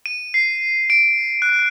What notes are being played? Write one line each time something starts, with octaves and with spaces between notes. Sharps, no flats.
D#7
C7
D7
F#6